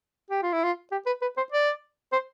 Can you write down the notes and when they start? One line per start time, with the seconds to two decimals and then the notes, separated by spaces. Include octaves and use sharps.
0.30 G4
0.43 F4
0.53 E4
0.63 F4
0.91 G4
1.06 B4
1.22 B4
1.37 C5
1.52 D5
2.12 C5